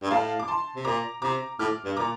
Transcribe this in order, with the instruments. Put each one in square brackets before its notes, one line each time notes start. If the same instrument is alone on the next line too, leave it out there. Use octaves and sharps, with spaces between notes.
[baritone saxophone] G2
[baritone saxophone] A2 [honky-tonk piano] F5 A5
[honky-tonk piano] D6
A5 C6
[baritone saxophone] C3
[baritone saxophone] A#2 [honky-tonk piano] A#5 D6
[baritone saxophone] C3 [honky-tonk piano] A#5 D6
[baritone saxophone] A2 [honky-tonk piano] D6 F6
[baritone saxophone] G2
[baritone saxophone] A#2 [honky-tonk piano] A#5 D6